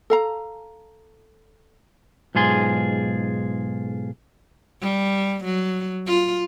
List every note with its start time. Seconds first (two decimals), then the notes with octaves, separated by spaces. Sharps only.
0.10 A4 F5 A#5
2.35 B1 G#2 F4 G#4 C6
4.82 G3
5.45 F#3
6.07 F4